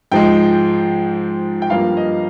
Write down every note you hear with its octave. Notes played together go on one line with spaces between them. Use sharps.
G#2 F3 G#3 G5
G5
G2 F3 A#3 F5
D#5